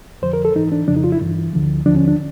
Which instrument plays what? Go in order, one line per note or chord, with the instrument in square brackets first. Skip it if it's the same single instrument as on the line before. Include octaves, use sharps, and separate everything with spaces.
[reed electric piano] F2 D3 F3 C5
A#4
A4
G#2 E3 D#4
D4
F2 C#3 F3 D4
D#4
F4
E4
G2 E3
D2 D3 F3
D#2 D3 F3 D4
C#4
D4